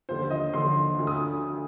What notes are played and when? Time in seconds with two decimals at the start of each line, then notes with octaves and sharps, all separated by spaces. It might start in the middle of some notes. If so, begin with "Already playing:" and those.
0.09 D#2 D3 F3 C5
0.30 D#5
0.53 D#2 D3 F3 C6
0.98 D2 D3 F3
1.07 D#6